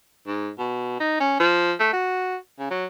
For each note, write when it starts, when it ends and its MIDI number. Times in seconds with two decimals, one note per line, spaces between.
0.27 0.50 44
0.59 0.97 47
1.00 1.16 63
1.20 1.35 61
1.40 1.74 53
1.80 1.91 57
1.93 2.36 66
2.59 2.70 49
2.71 2.85 54